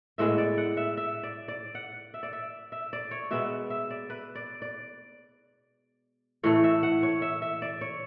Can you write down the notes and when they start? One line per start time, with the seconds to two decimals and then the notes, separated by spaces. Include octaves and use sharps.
0.18 A2 G#3 B3 E5
0.38 D5
0.58 F#5
0.77 E5
0.97 E5
1.23 D5
1.48 D5
1.75 F#5
2.14 E5
2.23 D5
2.33 E5
2.72 E5
2.93 D5
3.11 C#5
3.31 B2 G#3 B3 E5
3.70 E5
3.91 D5
4.10 B4
4.35 D5
4.62 D5
6.43 A2 E3 A3 C#5
6.64 E5
6.83 F#5
7.03 C#5
7.22 E5
7.42 E5
7.62 D5
7.81 C#5